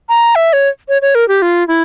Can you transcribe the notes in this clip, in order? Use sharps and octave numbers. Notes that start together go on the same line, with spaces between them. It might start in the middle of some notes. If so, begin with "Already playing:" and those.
A#5
E5
C#5
C#5
C#5
A#4
G4
F4
E4